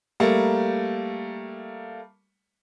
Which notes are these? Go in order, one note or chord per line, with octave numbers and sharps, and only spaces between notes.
G3 A3 A#3